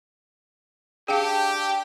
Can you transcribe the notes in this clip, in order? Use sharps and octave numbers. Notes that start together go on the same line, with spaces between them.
D4 G4 G#4 F5 G5